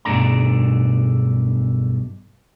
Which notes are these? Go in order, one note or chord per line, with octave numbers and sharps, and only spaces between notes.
B1 G2 B2 A3 D4 A#5